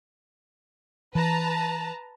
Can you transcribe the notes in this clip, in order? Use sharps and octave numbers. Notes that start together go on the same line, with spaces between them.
E3 B4 A5 A#5